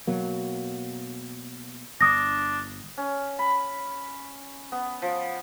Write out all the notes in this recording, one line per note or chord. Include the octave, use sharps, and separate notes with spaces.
B2 F#3 A#3
G1 D4 D#6 A#6
C#4
B5
B3
F3